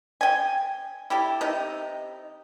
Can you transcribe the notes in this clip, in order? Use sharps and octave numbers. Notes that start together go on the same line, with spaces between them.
G5 G#5
E4 G4 A4
C3 D#4